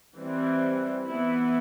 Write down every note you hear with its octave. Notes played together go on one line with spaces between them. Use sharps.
E3 G3 C4
E3 B3 E4